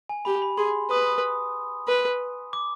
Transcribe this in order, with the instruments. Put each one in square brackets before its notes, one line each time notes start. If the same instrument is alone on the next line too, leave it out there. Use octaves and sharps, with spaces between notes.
[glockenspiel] G#5
[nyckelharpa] G4 [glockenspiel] B5
[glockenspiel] B5
[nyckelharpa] G#4 [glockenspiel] C6
[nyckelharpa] B4 [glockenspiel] D#6
[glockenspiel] D#6
[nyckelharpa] B4
[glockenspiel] D6